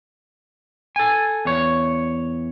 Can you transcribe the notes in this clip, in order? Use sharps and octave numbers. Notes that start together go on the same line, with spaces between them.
A4 G#5
E2 C#5